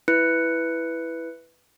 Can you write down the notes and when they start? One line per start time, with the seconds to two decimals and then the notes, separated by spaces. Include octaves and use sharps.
0.08 E4 B4 F#6 C#7